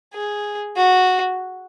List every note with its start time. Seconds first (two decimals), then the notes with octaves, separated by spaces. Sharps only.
0.14 G#4
0.77 F#4